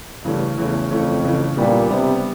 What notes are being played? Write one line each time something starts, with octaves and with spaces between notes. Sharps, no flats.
G2 C#3 E3 A3 C#4
E2 C#3 E3 A3 C#4
F2 C#3 E3 A3 C#4
C#3 E3 A3 C#4
A#2 G3 B3 D4 G4
C3 G3 B3 D4 G4